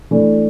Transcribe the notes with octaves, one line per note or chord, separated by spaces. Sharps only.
E3 A3 D4